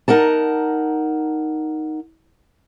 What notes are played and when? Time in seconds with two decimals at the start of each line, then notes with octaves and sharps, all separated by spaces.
0.08 D#4 A#4 F#5 A5